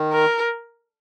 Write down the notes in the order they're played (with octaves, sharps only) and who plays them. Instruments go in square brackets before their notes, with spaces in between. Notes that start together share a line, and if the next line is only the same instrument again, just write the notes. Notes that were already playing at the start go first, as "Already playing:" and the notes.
Already playing: [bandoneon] D#3
[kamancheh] A#4